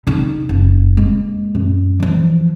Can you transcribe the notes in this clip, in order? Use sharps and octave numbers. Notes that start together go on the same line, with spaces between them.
C#3 D#4
F#1
G#3 A#3
F#2
E3 F3